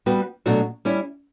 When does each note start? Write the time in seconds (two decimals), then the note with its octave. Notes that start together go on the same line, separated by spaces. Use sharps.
0.06 G3 B3 F#4 B4
0.46 B2 F#3 A3 D4 F#4
0.85 G3 C#4 E4